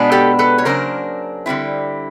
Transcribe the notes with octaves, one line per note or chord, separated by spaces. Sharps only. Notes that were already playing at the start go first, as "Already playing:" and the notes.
Already playing: B2 G#3 B3 D4
G4 A4
A4 B4
C#5
C#3 F#3 A#3 D4 A#4 C5
D3 G3 C4 E4